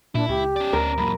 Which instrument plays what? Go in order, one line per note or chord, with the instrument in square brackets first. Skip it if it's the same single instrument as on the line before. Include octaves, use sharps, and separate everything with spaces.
[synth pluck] A#2 [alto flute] D4 [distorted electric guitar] E4
[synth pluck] C#2 [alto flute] G4
[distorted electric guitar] C#4 D5
[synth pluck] D2 [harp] A#4
[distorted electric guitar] F#2 A#2 [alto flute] B5